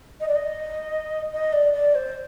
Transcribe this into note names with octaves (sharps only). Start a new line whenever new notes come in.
D#5
D5
D#5
D#5
D5
D5
C5